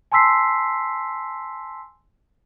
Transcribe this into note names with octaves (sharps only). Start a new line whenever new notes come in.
G#5 A5 C6 E6 B6 C7